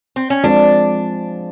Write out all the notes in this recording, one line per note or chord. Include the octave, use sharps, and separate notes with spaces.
C4
C#4
F3 G#3 C4 D4